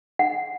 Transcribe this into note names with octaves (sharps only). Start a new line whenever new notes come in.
F#5